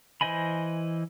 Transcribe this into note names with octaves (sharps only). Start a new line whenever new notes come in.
E3 C5 D#5 G#5 B5